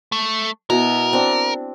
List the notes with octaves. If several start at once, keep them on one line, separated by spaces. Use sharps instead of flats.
A3
B2 E4 A#4
C4 D4